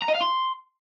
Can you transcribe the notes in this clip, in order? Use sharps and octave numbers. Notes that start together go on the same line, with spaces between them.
A#5
D#5
F5
C6